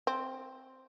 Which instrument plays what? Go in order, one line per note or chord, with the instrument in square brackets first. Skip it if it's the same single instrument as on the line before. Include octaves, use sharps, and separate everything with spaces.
[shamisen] C4